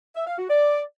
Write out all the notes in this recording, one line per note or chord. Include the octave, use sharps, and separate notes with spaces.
E5
F5
F#4
D5